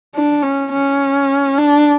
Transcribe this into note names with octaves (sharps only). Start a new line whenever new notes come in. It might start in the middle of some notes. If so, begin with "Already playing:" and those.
D4
C#4
C#4
D4